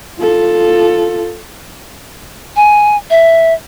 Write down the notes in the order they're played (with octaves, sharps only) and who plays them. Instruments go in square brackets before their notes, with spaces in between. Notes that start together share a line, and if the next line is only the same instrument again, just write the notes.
[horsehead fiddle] F4 A4
[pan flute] G#5
E5